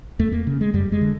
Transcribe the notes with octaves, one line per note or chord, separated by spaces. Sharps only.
E2 A3
A#3
C#3
G#3
F#2 G3
G#3
D3